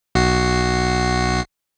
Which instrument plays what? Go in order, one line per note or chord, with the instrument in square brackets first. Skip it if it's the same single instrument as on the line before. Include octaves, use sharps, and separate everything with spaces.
[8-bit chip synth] B1 F#4 C7